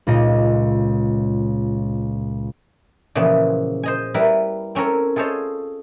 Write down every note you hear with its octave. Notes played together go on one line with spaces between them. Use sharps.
C#2 A#2 D#5
A#2 C#3 E3 F3 B3
C5 D#5 G#5
G3 E4 A#4 B4
C4 C#4 A4 A#4 C#5
F4 G#4 A4 C5 C#5 D#5